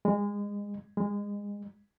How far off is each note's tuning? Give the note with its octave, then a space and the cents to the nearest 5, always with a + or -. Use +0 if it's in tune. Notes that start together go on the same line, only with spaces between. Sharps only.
G#3 -25
G#3 -25